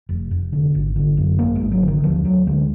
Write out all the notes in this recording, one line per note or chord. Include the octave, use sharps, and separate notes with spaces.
F1
F1
D3
G#1
D3
F#2
G#1 A#3
G#3
G#1
F#3
D3
D#3
D2 F3
D2 F#3
D3 G#3